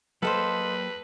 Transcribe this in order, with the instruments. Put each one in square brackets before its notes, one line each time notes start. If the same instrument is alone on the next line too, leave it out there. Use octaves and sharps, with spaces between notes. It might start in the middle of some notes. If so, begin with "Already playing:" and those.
[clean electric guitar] F#3 A#3 G4 [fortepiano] A4 [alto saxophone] B4 [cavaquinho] C5 D#5 F5